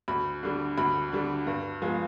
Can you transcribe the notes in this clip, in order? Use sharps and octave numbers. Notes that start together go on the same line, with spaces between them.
D2 B5
D3 G3
D2 B5
D3 G3
G2
F3 G#3 B3